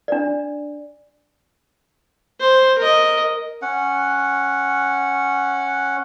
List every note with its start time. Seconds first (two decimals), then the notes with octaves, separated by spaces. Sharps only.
0.08 D4 D5
2.40 C5
2.79 A#4 D#5
3.62 C#4 F#5